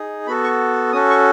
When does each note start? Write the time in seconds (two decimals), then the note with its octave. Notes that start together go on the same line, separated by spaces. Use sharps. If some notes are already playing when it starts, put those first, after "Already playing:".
Already playing: D#4 G#4
0.27 B3 F#4 A4 B5
0.44 C#6
0.92 C#4 F#4 A4 D#6
1.10 C#6